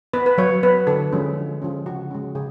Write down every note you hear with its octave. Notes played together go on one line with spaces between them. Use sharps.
B3 B4
B4
F#3 C#5
B3 B4
D3 A4
F3 G#3 C#4
D3
F3 G#3 C#4
C#3 F#4
G#3 C#4
C#3 G#4